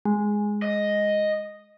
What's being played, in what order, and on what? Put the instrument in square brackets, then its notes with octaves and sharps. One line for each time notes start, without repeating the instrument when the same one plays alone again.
[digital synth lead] G#3
[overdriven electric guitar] D#5